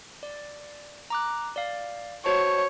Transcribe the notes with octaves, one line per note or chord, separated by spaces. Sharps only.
D5
A#5 D6 F#6
D5 F5
F#4 C5 C#5 A5